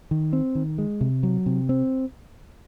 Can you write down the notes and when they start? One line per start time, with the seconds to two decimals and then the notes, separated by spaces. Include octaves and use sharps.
0.11 D#3
0.33 C4
0.55 D#3
0.78 G#3
1.01 C3
1.23 F#3
1.46 C3
1.69 C4